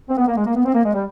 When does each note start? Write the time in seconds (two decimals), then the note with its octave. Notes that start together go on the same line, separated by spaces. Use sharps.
0.09 C4
0.18 B3
0.28 A#3
0.37 G#3
0.46 A#3
0.56 B3
0.65 C4
0.75 A#3
0.84 G#3
0.94 G3